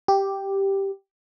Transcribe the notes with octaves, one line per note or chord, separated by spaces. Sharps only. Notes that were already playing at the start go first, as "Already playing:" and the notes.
G4